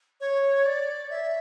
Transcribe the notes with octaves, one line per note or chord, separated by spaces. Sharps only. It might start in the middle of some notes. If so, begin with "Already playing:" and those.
C#5
D5
E5